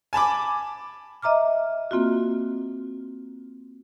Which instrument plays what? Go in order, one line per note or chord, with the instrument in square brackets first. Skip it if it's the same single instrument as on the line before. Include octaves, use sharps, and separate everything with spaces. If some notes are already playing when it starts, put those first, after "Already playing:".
[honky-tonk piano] G#5 A5 B5 D6
[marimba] D#5 E5 A#5 D6 F6
A#3 C4 F4 F#4